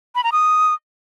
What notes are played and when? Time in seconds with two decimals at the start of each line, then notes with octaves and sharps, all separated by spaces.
0.15 B5
0.24 A#5
0.32 D#6